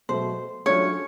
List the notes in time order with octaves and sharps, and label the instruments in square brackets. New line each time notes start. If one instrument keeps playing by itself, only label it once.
[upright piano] B2 F#3 A3 [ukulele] C5
[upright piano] F#3 A3 D4 F4 [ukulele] C#4 C#5